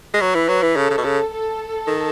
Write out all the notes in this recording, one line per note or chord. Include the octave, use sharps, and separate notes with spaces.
G#3
F#3 B4
E3
F#3
E3
C#3 A4
C#3
B2
C#3
A4
D#3